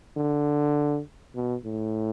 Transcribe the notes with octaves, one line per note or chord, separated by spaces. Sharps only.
D3
B2
A2